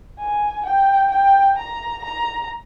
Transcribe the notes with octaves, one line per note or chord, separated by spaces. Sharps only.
G#5
G5
G5
A#5
A#5